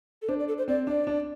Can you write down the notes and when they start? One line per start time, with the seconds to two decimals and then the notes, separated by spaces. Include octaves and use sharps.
0.22 A4
0.29 D4 C5
0.39 D5
0.48 A4
0.58 C5
0.68 C4 D5
0.87 D4 D5
1.07 D4